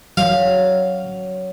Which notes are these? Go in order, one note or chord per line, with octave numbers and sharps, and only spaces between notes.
F#3 F5